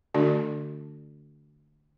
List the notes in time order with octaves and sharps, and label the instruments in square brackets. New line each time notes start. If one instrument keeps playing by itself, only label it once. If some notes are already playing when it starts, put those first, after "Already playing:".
[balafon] D3 A3 D4 F#4 D5